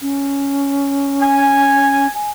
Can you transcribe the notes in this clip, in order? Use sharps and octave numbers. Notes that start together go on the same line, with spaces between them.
C#4
G#5
G#5